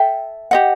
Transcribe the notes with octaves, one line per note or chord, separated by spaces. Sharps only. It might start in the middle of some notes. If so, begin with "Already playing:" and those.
Already playing: A4 E5 G5
G4 D#5 F#5